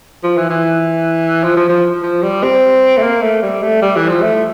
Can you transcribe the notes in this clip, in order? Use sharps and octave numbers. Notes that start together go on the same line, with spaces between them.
F3
E3
E3
F3
F3
F3
F3
G3
C4
A3
A#3
A3
G3
A3
G3
E3
F3
A3